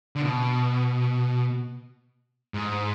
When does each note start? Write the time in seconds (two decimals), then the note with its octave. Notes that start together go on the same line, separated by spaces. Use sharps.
0.16 D3
0.21 B2
2.54 G#2